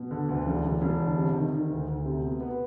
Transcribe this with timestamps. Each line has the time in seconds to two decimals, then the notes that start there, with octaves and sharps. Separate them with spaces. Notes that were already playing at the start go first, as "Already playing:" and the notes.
Already playing: B2
0.11 D3
0.29 D2
0.46 E1
0.64 E1
0.82 E1
0.99 D3
1.17 C3
1.34 D#3
1.52 D#3
1.70 D2
1.88 D2
2.05 C3
2.23 B2
2.41 B3